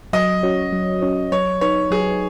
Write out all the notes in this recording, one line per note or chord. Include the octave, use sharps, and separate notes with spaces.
F#3 D#5
C#4 F#4 C#5
F#3
C#4 F#4 C#5
F#3 C#5
D#4 B4 C#5
F#3 G#4